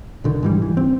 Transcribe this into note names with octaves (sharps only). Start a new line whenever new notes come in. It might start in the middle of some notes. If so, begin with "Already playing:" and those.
B1 D3 D#3
G#2 E3 G3
E3
C4